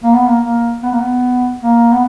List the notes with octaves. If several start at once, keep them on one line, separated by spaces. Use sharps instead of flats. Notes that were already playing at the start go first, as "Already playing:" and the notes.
A#3
B3
A#3
A#3
B3
A#3
B3
A#3
B3